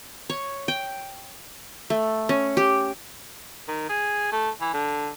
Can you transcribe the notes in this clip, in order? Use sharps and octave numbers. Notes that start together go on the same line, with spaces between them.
C#5
G5
A3
C#4
G4
D#3
G#4
A3
E3
D3